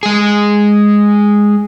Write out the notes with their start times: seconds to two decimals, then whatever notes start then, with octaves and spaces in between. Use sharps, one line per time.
0.03 G#3 G#4